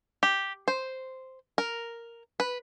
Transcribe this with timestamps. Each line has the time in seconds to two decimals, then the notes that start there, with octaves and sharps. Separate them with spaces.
0.23 G4
0.68 C5
1.58 A#4
2.40 B4